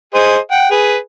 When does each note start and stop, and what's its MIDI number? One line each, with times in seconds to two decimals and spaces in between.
0.14 0.38 68
0.14 0.38 72
0.14 0.38 75
0.51 0.68 78
0.51 0.68 79
0.71 0.97 68
0.71 0.97 71